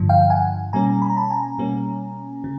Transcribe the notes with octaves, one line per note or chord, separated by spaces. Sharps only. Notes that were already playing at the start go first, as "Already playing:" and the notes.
Already playing: G2 D3 F3
F5 G5
F#5 G#5
B2 G3 A#3 C#4 G#5 A#5
B5
A#5
A5 B5
G#5 A#5
B2 G3 A#3 C#4
C#3